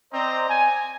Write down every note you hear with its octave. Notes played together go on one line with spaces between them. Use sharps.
C4 C5 D5 D#5 A#5
G#5